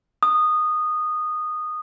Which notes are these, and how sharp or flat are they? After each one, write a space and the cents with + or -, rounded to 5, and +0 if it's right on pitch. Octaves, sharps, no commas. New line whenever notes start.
D#6 -15